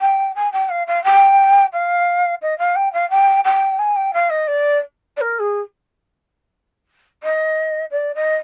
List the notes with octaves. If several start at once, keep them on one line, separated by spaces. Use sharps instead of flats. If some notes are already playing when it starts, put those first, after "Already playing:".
G5
G#5
G5
F5
F5
G5
F5
D#5
F5
G5
F5
G5
G5
G#5
G5
F5
D#5
D5
D5
A#4
G#4
D#5
D5
D#5